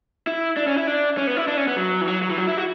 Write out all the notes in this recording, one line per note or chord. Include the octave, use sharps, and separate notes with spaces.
E4
D4
C#4
E4
D4
C#4
B3
E4
D4
C#4
B3
F#3
E3
F#3
F#3
E3
F#3
E4
F#4